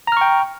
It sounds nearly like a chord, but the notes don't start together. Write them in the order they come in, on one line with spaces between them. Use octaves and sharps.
A#5 F6 C#6 G5